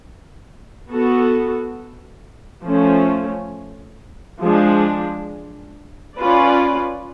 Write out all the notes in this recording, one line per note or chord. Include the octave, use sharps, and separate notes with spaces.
B3 F#4 A4
F3 A3 C#4
F3 G#3 D4
C#4 F4 B4 D5